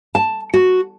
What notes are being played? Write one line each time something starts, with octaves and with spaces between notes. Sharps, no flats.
A5
F#4